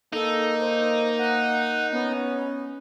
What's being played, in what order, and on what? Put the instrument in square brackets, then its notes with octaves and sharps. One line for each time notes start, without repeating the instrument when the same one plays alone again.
[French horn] A#3 [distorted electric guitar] D#4 [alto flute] A4
[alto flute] C5
F#5
[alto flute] B3 [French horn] C#4